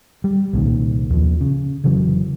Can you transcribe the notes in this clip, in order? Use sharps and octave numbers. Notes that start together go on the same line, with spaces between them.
G3
C2 A#2 D#3
D#2 F3
C#3
F1 C#3 E3 F#3